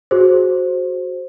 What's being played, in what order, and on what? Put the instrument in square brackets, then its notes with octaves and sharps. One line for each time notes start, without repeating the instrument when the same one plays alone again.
[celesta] F#4 G#4 C5